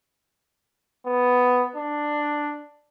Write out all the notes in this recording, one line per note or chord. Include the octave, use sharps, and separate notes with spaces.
B3
D4